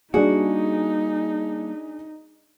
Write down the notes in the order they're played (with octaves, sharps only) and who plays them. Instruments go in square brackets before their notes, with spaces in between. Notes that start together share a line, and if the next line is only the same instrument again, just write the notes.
[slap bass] G3 A#3 [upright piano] D4 G#4 [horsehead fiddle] D#4 [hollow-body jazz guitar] F#4